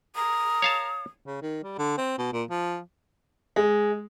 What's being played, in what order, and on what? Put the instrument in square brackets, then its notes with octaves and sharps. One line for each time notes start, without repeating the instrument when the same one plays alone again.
[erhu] A#4 [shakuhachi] D#6
[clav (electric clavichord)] C#5 F5 A5
[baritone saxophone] C#3
D#3
G3
D3
C4
B2
A#2
F3
[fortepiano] G#3